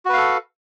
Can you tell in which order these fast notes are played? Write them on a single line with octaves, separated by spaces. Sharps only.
F#4 B4 F5 A4